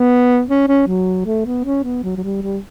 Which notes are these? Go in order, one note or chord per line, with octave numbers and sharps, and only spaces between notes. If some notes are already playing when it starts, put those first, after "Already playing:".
Already playing: B3
C#4
C#4
F#3
A3
B3
C#4
B3
F#3
F#3
G3
G3